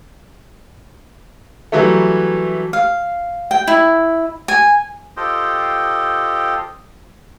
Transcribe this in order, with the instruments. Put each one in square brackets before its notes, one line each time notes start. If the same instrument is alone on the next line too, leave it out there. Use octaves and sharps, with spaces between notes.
[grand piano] E3 F#3 G3 A3
[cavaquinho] F5
G5
E4
G#5
[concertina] F4 G4 A4 C5 D#5 G5